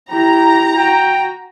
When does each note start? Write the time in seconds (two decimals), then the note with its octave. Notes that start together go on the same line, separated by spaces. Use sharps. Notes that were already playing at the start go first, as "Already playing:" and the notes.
0.12 E4 G4 A#5
0.77 F#4 G5